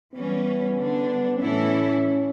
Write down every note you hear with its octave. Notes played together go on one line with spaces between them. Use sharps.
E3 G3 B3 C#4
D3 G3 D4
A2 E3 A3 C#4 E4 A4